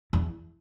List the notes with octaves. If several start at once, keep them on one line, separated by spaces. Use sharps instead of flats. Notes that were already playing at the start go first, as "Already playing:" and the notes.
E2